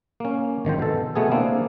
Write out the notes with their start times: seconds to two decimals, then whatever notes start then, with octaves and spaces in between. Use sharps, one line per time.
0.20 A#3 C#4
0.65 G#1 D#3 F3 C5
0.79 B2 A4
1.15 B2 A3 B3 G#4
1.32 A#3 C4 D4 E4 F4